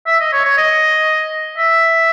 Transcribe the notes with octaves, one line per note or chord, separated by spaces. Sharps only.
E5
D#5
C#5
C#5
D#5
E5